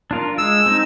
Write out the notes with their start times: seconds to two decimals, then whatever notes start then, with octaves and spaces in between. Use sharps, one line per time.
0.11 D4 F4 A#4
0.38 G#3 E6
0.66 C4 D#4